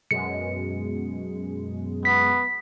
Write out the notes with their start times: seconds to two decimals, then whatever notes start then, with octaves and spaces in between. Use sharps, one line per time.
0.11 F#2 B2 G#3 C#7
2.05 B3 B6